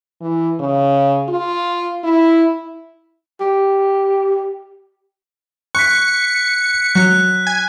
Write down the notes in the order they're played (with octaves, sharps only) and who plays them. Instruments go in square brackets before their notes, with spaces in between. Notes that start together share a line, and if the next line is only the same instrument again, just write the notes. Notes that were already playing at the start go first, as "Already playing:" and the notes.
[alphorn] E3
C#3
F4
E4
[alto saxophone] G4
[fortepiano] C#6 [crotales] F#6 B6 [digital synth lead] C#7
[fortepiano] F#3 [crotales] F#6
[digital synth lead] G#5